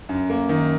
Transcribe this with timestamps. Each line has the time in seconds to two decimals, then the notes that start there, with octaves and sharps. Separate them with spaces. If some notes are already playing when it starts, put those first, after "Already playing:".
0.09 F#2
0.29 A#3
0.49 D#3